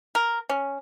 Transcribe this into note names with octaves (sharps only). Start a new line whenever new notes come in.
A#4
C#4